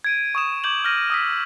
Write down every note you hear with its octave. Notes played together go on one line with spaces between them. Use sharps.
G#6 D7 D#7
C#6 D#6 E7
D6 G6 G#6 F#7
F6 G6 A#6 D#7
D#6 E6 B6